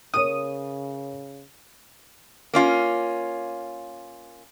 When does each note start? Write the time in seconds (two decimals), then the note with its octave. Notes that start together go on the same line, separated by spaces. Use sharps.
0.14 C#3 A#4 C#5 D#6
2.53 A#3 C#4 F4